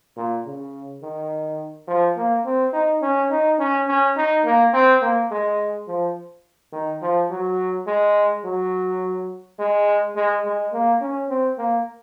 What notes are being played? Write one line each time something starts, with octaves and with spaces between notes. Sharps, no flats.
A#2
C#3
D#3
F3
A#3
C4
D#4
C#4
D#4
C#4
C#4
D#4
A#3
C4
A#3
G#3
F3
D#3
F3
F#3
G#3
F#3
G#3
G#3
G#3
A#3
C#4
C4
A#3